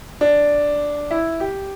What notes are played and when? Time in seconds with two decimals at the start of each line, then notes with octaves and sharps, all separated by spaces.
0.21 D4
1.11 E4
1.40 G4